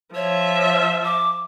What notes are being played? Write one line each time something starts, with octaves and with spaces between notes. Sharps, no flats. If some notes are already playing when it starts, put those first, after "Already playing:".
F3 C#5 E5
D6